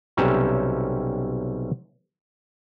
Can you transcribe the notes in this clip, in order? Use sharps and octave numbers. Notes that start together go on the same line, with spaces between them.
B1 C3 G3 C#4 E5 A#5